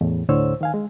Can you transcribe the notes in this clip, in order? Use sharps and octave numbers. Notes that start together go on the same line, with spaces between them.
E2 A2
D2 A2 D3 C5 C#5 E6
D#3 F5 G#5
G#3